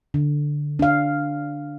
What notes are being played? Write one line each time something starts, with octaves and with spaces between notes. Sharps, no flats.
D3
D4 F5